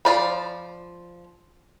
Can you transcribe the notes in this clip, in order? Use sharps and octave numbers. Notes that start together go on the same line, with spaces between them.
F3 D5 B5